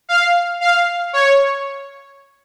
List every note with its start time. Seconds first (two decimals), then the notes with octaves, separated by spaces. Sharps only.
0.09 F5
0.61 F5
1.13 C#5